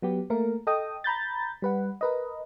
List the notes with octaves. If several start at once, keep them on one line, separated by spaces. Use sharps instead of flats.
F#3 B3 G4
A3 A#3 A#4
A4 D#5 G5 D#6
A#5 B5 G6 A6
G3 B4 F#5
A#4 B4 D#5